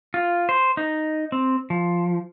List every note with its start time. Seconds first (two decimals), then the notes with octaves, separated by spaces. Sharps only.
0.14 F4
0.49 C5
0.77 D#4
1.32 C4
1.70 F3